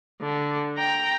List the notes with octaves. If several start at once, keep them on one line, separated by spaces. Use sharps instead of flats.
D3
G5 A#5